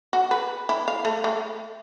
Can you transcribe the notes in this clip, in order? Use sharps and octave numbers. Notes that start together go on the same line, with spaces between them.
F#4
B4
E4
F5
A3
A3